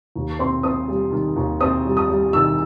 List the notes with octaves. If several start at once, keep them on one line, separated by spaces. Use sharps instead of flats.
D#2
C4 C6
C4 D#6
G3
D#3
D#2
C4 D#6
G3
D#6
G3
D#3 E6